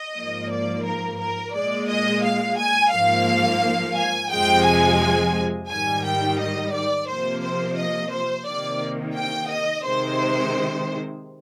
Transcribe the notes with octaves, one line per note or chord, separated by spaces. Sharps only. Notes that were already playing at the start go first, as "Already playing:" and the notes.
Already playing: D#5
G#2 F3 A#3
D5
A#4
A#4
A#2 G#3 D5
D#5
F5
G#5
G#2 F3 A#3 F5
G#5
F2 C3 F3 G#3 G5
G#5
G#2 D#3 G3 G#5
G5
D#5
D5
C3 F3 A#3 C5
C5
D#5
C5
C3 D#3 A#3 D5
G5
D#5
C3 D#3 G#3 C5